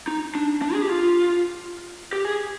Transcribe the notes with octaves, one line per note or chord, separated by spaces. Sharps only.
D#4
D4
D4
G#4
G4
F4
G4
G#4